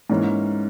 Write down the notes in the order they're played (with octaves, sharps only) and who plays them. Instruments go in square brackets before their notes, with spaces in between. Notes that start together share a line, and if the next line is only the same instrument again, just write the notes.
[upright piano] G#2 E3 A#3 C#4